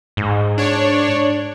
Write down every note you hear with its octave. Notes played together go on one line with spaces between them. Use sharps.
G#2
D4 C#5